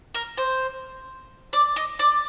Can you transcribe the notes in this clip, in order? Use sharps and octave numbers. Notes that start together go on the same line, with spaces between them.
A#4
C5
D5
D#5
D5